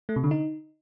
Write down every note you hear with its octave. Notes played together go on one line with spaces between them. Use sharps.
A3
C3
D3
D#4